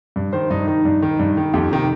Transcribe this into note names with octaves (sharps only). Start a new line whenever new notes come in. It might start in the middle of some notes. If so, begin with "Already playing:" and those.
G2
D#3 C5
G2 D#4
D#3 D#4
G2
D#3
G2
D#3
F2 G4
C3 D#3